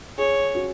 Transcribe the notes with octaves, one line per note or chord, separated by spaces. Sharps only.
G#4 C#5
F#4